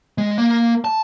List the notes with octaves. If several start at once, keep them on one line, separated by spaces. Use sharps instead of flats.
G#3
A#3
A5